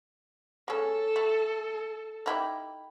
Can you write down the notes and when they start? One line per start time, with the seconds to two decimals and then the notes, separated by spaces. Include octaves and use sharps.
0.68 G#3 C#4 A4
1.16 A3
2.26 D#4 E4 G4